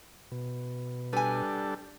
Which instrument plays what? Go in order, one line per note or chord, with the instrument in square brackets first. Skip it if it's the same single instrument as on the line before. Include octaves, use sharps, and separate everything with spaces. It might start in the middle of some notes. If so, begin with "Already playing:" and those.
[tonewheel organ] B2
[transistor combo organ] G3 D4 A4 [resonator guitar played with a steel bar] B4 G#5